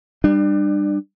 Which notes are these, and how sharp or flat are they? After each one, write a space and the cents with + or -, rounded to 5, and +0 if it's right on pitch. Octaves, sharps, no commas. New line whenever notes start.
G3 +15 D4 +30